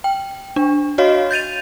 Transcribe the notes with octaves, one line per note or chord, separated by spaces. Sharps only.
G5
D4
F#4 C#5 D#5 F5
G6 A6 D#7 F7